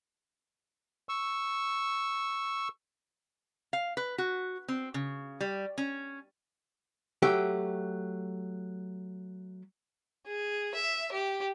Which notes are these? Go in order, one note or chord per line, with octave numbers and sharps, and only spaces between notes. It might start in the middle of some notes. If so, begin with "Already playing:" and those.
C#6 E6
F5
B4
F#4
C4
C#3
G3
C#4
F#3 A3 G4
G#4
E5
G4